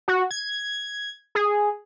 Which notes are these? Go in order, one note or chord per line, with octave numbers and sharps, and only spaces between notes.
F#4
G#6
G#4